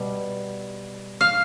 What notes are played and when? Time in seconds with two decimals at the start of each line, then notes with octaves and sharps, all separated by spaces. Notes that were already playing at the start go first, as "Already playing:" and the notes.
Already playing: B2 G3
1.21 F5